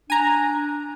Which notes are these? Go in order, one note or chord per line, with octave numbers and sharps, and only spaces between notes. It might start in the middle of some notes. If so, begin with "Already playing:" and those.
D4 G#5 A#5